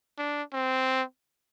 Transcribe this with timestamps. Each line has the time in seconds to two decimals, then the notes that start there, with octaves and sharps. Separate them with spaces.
0.18 D4
0.53 C4